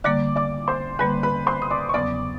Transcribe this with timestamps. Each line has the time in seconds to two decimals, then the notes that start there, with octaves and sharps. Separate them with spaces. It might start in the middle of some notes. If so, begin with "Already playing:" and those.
0.04 D3 G3 A#3 D5 D6
0.36 D5 D6
0.68 C5 C6
0.99 D3 G3 A#3 B4 B5
1.23 B4 B5
1.46 C5 C6
1.62 D#6
1.71 D5 D6
1.89 C#6
1.94 E2 C#3 F#3 B3 D5 D6